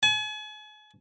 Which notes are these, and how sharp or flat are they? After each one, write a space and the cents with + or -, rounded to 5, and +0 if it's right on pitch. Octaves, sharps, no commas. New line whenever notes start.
G#5 +40